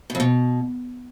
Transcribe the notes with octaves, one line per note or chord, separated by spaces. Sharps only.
B2
F2
B2